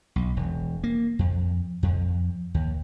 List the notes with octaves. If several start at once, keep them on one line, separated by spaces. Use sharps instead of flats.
B1
E1
A#3
F2
F2
D#2